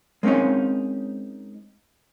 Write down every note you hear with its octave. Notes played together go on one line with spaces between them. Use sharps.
G#3 A#3 C4 C#4 D#4